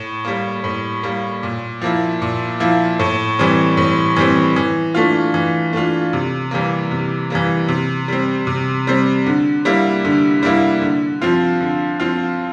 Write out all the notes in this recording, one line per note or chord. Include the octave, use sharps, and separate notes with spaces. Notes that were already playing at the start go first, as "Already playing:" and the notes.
Already playing: A2
G3 A#3
A2
G3 A#3
A#2
F3 A#3 E4
A#2
F3 A#3 E4
A2
E3 G3 C4
A2
E3 G3 C4
E3
A3 D4 F4
E3
A3 D4 F4
C3
E3 G3 A#3
C3
E3 G3 A#3
C3
G3 C4
C3
G3 C4
D3
G3 A#3 E4
D3
G3 A#3 E4
D3
F3 C4 F4
D3
F3 C4 F4